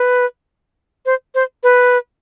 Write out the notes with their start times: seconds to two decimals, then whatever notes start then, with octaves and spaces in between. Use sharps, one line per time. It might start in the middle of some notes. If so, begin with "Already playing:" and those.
Already playing: B4
1.06 C5
1.35 C5
1.63 B4